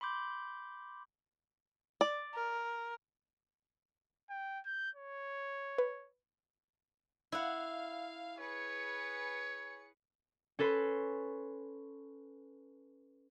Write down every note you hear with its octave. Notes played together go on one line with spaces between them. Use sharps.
B5 C6 D6 G6
D5
A#4
G5
G6
C#5
B4
E4 F5 F#5
G#4 B4 C#5 C#7
C#4 A4 B4 C6